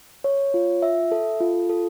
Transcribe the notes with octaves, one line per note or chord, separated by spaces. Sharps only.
C#5
F4
E5
A4
F4
A4